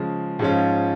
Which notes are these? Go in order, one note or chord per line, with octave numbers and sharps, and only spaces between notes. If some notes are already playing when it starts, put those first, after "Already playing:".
Already playing: C#3 F3 G#3
G#2 F3 G#3 C#4 F4